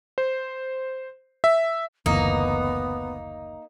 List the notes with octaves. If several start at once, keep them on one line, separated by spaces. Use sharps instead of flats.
C5
E5
F#1 D2 E3 A#3 B3 D#4